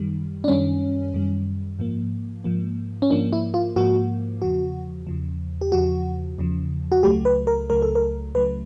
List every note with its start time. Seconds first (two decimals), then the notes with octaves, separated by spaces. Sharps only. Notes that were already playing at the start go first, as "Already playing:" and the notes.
Already playing: F#2 D#3 G3
0.44 D4
0.48 F#2 D#3 G3 C#4
1.14 F#2 D#3 G3
1.79 G#2 F3 A#3
2.44 G#2 F3 A#3
3.02 C#4
3.10 G#2 F3 A#3 D4
3.33 E4
3.54 F4
3.76 G#2 F3 A#3 F#4
4.42 E2 C#3 F3 F#4
5.07 E2 C#3 F3
5.61 G4
5.72 E2 C#3 F3 F#4
6.38 E2 C#3 F3
6.92 F#4
7.03 C#2 C#3 F#3 A3 G4
7.25 B4
7.47 A#4
7.70 C#2 C#3 F#3 A3 A#4
7.82 A4
7.95 A#4
8.34 C#2 C#3 F#3 A3 B4